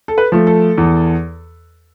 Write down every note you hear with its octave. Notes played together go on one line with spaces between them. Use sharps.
A4
B4
F3 A3
A4
E2